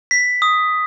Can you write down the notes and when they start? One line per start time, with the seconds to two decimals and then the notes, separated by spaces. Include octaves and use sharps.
0.11 B6
0.42 D#6